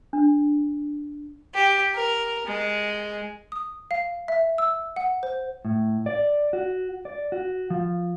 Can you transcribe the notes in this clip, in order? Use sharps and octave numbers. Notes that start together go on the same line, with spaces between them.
D4
G4
A#4
G#3
D#6
F5
E5
E6
F#5
C5
A2
D5
F#4
D5
F#4
F3